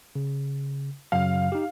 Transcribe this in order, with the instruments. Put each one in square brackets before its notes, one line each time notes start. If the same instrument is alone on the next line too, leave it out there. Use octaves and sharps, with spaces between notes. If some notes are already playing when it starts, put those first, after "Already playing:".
[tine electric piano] C#3
[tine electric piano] F#2 C#3 F#3 [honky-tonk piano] F5
[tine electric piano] D#4 G4